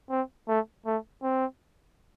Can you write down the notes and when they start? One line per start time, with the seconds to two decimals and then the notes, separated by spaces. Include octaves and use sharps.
0.10 C4
0.48 A3
0.86 A3
1.23 C4